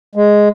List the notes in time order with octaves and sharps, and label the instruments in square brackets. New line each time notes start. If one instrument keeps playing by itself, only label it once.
[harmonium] G#3